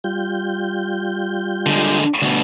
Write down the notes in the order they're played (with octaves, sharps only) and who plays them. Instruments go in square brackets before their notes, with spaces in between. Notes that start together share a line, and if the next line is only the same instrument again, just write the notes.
[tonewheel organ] G3 F4 G6
[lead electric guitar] D3 G#3
D2 B2